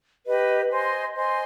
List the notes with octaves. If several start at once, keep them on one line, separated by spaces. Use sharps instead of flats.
G4 B4 D#5
C5 D#5 G#5 C6
C5 D#5 G#5 C6